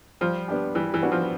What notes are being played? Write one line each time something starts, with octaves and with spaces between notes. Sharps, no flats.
F3 G3
B3 D4 G4
E3 G3
E3
B3 D4 F#4
F3